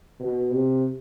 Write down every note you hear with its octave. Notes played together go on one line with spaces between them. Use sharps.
B2
C3